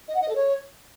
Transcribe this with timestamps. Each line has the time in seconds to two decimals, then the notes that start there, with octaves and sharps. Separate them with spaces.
0.08 D#5
0.15 F#5
0.22 D#5
0.28 A4
0.35 C#5